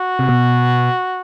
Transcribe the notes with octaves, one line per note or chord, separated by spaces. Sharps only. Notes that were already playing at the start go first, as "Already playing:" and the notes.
Already playing: F#4
C3
B2